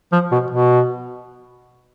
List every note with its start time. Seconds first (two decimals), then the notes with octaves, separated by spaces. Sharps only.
0.12 F3
0.32 B2
0.51 B2